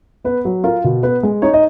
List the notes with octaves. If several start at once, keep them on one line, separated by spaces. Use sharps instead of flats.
B3 B4
F#3
F4 A#4
B2
B3 B4
G#3
D#4 C#5
D#5